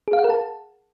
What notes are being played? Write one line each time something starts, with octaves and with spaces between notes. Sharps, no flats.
G#4
F5
F#5
A#4
A5